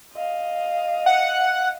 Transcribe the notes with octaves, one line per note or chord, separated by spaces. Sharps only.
D#5 F5
F#5